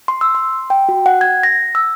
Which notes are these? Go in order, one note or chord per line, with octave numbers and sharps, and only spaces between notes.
C6
E6
C6
G5
F#4
F#5
G#6
A#6
E6